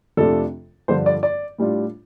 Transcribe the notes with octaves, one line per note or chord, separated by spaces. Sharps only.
F2 C3 A3 D4 F4 A4
G2 D3 F3 D4 F4 C5
D5
D5
A2 G3 D4 F4